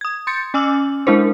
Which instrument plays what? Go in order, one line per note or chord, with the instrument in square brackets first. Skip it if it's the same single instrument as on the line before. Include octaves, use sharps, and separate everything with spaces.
[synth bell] D#6 G#6
C6 G6 A6 C#7
C#4 G#5 D6 E6 F6 F#7
G#3 D4 E4 A#4 C5